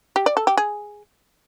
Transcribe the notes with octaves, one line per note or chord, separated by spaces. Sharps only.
G4
D5
A4
G4
G#4